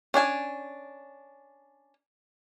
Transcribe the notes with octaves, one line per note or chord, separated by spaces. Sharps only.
C#4 D4 G#5 A5